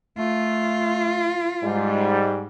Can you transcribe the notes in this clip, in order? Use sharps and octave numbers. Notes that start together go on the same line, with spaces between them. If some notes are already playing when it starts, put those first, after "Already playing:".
A3 F4
G#2 G3 G#3